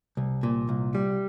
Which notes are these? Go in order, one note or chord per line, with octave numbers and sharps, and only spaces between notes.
C2
A#2
C2
G3